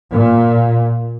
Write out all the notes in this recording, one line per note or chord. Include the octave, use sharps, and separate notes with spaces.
A#2